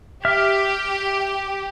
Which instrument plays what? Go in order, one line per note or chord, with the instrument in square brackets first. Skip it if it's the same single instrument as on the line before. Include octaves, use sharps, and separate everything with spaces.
[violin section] G4 [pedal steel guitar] E5 F6